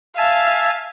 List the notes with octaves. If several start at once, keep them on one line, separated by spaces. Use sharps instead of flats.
E5 F5 G#5 A5